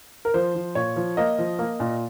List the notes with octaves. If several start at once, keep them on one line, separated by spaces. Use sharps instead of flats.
A#4
F3 C5
F3
A#2 C#5
F3
A#3 D#5
F3
A#3
A#2